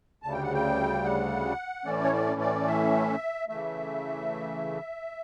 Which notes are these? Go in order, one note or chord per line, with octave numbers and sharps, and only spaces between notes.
D2 C#3 G3 A5
G5
F#5
G5
F#5
A2 E3 A3 C#4 D5
C#5
D5
D5
E5
C#3 E3 A3 E5